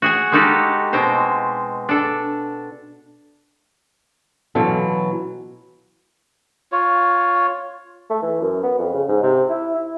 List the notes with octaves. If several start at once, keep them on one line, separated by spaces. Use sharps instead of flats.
F#4 G#4 G#5
G#3 A#3 D#4 F#4 G4 A4
B2 G#3 C4 C5
D4 A4
B2 E3 F#3 C#4 F4 A4
F4 C#5
A3
E3
F#2
B3
F2
C#3
G#2
C3
E4
E4